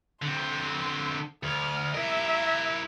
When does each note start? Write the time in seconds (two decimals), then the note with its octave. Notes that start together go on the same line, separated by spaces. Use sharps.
0.22 D3 C4 C6
1.43 D2 F6
1.94 E4 A#4 E5